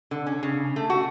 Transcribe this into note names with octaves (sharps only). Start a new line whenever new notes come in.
D3
C#4
C#3
A3
F#4